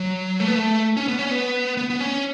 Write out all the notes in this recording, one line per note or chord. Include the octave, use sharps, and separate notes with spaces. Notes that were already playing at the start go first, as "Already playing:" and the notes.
Already playing: F#3
A3
B3
A3
C#4
B3
C#4
B3
B3
B3
C#4